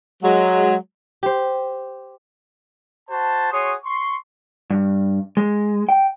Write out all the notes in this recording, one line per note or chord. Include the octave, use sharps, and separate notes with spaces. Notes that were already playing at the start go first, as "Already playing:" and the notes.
F#3 G#3
G4 C5
F#4 C5 A5
F#4 G#4 C#5 C6 D#6
C6 C#6
G2
G#3
G5